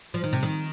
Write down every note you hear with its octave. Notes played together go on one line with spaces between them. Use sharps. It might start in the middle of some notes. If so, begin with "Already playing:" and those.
F3
D#3
C3
D#3